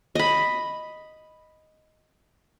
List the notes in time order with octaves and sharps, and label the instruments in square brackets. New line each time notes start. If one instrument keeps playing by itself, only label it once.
[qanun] D#5 B5